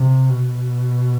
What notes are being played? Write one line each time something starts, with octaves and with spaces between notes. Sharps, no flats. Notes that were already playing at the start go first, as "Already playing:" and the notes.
Already playing: C3
B2